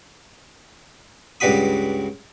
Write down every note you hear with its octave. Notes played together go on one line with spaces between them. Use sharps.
C#2 G2 G3 F#4 B5 D#6